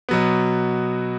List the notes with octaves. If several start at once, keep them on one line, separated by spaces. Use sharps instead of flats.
B2 F#3 B3